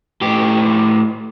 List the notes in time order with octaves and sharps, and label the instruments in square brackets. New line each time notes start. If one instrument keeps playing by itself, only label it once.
[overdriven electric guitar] A2 G4